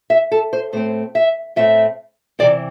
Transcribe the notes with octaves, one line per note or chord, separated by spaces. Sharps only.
E5
A4
C5
A2 A3 C4 C5
E5
A2 A3 C4 E5
C3 E3 C4 D5